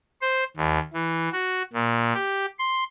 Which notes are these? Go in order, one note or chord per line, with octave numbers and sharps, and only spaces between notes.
C5
D#2
E3
F#4
A#2
G4
C6